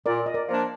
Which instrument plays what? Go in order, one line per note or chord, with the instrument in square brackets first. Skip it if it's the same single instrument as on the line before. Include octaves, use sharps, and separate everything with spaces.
[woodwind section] A#2 [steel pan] A#4 D5
[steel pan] D#5
A#4 D5
[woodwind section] F3 A#3 D4